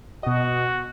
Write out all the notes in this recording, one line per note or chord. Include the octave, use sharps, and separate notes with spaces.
B2 F#4 D#5